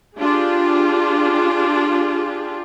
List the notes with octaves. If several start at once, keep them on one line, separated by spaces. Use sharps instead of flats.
D4 F4 G4 G#4